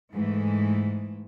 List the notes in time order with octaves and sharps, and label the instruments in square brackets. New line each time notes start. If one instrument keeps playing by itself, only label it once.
[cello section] G#2 E3 A3